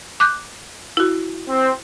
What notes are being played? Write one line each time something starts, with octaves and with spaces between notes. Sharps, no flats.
D6 F#6 G6
E4 F#4
C4